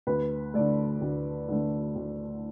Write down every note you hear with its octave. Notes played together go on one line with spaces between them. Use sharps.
D2 B4
D3 A3 D5
D2
D3 A3
D2